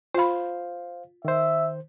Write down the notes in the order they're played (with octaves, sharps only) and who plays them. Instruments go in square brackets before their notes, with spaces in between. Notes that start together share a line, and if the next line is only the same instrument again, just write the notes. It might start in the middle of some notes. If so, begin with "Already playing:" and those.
[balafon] F4 B5 [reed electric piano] C5 F5
[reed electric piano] D#3 C5 [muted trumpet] E5